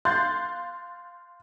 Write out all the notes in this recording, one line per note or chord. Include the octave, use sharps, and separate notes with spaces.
F5 C6 F#6 G6 A6